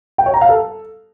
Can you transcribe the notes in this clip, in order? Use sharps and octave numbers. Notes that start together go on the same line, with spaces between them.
G5
C#5
A#5
F5
A4